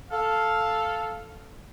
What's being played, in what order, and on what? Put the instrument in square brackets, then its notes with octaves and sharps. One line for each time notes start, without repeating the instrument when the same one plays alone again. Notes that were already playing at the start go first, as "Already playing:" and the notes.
[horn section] A4 F5